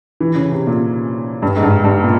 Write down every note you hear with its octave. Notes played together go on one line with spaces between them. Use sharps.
E3
C#3
C3
A#2
G2
G#2
G2
G2
A#2